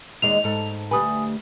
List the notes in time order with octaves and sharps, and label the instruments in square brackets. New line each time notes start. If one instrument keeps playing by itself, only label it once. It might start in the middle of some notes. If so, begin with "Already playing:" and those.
[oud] D#2 G#3 D5 [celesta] F7
[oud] G#2 A4
[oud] D2 G3 B4 [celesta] G#5 D#6